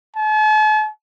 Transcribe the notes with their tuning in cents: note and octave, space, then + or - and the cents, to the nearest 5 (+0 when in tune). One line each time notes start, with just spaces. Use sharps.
A5 -45